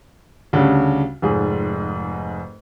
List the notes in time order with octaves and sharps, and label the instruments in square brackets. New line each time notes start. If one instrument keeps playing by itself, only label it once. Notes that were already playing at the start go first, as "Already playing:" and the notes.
[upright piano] D2 C#3 G3 D4
F1 G#2 G#4